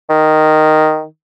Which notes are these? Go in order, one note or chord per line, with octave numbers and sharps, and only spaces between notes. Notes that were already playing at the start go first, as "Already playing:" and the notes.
D#3